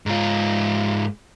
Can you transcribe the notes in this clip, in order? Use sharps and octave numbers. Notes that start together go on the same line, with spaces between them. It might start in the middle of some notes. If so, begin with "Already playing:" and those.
G#2 F4